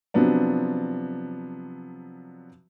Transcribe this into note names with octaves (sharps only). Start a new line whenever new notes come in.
C3 F3 F#3 B3 D4